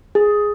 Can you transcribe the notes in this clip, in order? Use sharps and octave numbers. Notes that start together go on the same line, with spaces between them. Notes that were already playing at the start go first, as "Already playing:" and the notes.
G#4